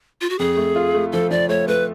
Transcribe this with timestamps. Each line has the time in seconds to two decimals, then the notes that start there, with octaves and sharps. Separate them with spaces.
0.21 F4
0.30 F#4
0.39 F2 G#4
0.57 A3
0.76 F4
0.95 A3
1.12 F3 A4
1.31 F3 D5
1.49 A3 C#5
1.68 A3 B4